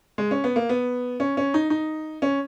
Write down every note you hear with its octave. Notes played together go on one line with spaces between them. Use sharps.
G#3
C#4
B3
A#3
B3
C#4
C#4
D#4
D#4
C#4